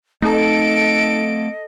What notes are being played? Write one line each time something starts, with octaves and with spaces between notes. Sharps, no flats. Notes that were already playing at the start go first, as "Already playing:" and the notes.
A3 C4 D#4 A4 D#5 D7